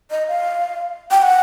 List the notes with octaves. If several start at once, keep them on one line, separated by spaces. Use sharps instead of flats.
D#5
F5
G5
F#5